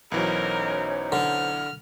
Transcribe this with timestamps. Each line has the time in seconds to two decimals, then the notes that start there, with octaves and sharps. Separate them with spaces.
0.12 B1 E3 F#3 C#4 D#4 A#4 C5
1.12 D3 F6